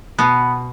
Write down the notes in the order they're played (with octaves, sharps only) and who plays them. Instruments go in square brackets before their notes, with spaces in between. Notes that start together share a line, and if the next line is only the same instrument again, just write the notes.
[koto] B2 B3